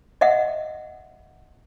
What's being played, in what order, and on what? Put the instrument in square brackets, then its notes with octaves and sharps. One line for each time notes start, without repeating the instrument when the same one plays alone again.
[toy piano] D#5 E5 F#5